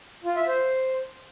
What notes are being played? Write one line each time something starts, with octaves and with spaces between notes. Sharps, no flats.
F4
E5
C5